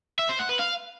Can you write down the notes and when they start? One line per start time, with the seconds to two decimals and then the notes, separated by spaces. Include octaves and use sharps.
0.19 E5
0.29 C5
0.39 F#5
0.49 B4
0.59 F5